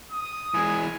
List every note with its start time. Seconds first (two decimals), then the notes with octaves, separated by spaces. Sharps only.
0.12 D#6
0.54 E3 G#3 G#5